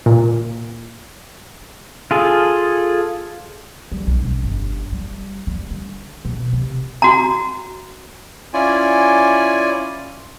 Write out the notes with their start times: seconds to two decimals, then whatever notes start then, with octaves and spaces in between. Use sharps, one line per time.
0.06 A#2
2.11 F4 G#4 A4
3.92 G3
4.07 B1
4.24 C#4
4.43 G1
4.92 G3
5.47 G3
5.70 D3
6.25 B2
6.53 C3
7.02 F#4 A#5
8.54 C#4 E4 F4 D5 G#5